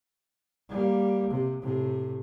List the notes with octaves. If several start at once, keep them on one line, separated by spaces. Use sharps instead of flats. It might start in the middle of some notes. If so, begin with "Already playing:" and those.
G3 A#3
C3
A2 C3